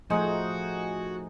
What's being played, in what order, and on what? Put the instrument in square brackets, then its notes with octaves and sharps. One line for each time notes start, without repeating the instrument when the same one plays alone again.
[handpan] F3 A3 [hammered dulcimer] D#4 G#4 C5 [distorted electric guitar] F#4 [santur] D#5 G#5